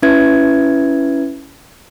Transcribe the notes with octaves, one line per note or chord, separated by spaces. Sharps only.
C#4 E4 B4 E5 G#6